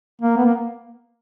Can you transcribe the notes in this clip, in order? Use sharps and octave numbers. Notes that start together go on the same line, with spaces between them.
A#3
B3
A#3